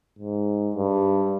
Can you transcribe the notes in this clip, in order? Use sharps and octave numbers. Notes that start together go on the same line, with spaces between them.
G#2
G2